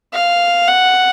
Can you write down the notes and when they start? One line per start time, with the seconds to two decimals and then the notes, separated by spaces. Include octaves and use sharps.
0.13 F5
0.67 F#5